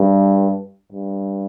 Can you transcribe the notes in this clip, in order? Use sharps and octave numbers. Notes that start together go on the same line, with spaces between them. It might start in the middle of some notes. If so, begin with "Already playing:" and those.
Already playing: G2
G2